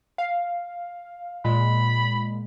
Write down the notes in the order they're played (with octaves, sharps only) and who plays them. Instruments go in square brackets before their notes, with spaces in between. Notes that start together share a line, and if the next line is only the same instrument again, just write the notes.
[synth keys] F5
[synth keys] A#2 G#3 [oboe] B5